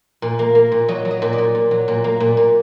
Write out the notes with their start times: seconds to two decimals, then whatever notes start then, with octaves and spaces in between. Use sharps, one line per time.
0.22 A#2
0.39 A#3
0.55 A#3
0.72 A#2
0.88 F#3 D#5
1.05 F#3
1.11 D#5
1.22 A#2
1.33 D5
1.38 A#2
1.55 A#2
1.71 F#3
1.88 A#2
2.04 A#3
2.20 A#2
2.37 A#2